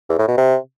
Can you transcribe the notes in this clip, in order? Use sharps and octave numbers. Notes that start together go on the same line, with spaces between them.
E2
A2
B2
C3